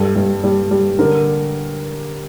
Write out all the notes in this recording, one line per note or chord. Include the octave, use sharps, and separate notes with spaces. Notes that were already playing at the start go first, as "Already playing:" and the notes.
Already playing: G2 A4
G2
G3
G3
D3 A#4